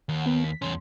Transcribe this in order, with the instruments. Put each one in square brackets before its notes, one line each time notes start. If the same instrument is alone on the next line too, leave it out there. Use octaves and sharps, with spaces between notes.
[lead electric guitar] D#2 [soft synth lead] F#5
[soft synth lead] B3
B6
[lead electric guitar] E2 C#4 [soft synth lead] C6